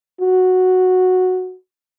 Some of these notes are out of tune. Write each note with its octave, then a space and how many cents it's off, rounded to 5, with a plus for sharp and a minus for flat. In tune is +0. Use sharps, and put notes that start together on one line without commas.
F#4 -5